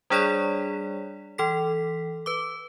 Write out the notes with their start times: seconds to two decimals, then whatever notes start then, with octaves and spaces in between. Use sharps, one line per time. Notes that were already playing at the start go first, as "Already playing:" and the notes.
0.10 G3 D4 G#4 C#5 D5 B6
1.38 E3 A4 B6
2.26 B4 D6